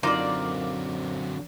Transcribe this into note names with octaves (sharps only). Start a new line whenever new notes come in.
F#2 D3 F#3 A#3 C4 D#4 F4 D5